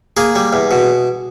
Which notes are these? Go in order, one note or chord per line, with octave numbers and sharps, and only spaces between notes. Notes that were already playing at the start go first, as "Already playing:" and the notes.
A#3 G#4
G3
E2
B2